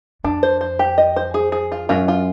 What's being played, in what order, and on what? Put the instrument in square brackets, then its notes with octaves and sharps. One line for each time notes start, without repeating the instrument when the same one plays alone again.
[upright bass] F2 [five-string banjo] D4
[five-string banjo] C5
C5
G4
D#5
C5
G#4
G#4
F4
[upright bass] F#2 [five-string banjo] F4
[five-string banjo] F4